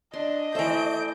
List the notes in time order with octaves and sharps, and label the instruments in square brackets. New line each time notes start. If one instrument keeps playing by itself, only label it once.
[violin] D4 [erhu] D#5 [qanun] C6
[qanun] E3 C5 [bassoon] A3 [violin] G6 D7